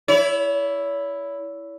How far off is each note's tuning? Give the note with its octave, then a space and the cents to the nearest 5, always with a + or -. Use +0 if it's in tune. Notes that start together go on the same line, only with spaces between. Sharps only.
E4 +0 C#5 +40